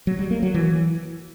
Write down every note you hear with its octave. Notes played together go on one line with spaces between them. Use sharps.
F#3
G3
A#3
F#3
E3